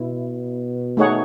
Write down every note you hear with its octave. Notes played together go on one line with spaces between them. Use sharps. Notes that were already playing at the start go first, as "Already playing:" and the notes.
Already playing: B2 E4
A3 D#4 G#4 C#5 F#5